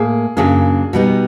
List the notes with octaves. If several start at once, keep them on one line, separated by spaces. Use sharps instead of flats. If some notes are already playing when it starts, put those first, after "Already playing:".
Already playing: A2 A#3 G#4
F#2 C#3 F#3 A#3 D4 G#4
B2 G3 B3 D#4